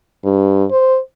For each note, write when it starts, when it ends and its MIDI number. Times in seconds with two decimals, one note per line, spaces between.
0.24 0.65 43
0.71 0.98 72